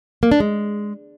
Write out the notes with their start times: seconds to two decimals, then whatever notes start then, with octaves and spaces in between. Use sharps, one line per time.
0.23 A#3
0.32 D4
0.40 G#3